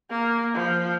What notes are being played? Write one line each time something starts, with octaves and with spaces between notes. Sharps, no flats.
A#3
F3